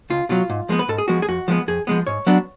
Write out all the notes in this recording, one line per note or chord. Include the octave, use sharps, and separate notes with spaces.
C#2 F4
B2 F#3 F4
G#2
F3 G#3 B3
B4
G#2 A4
G#4
F3 G#3 B3 F#4
G#4
F2 F#4
F3 G#3 B3
F2 G#4
F3 G#3 B3
G#2 C#5
F#3 B3 D4